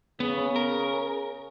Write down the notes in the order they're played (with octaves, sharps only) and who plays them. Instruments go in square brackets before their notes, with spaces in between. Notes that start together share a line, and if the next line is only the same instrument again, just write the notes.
[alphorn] C#3 [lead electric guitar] B3
[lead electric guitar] A#4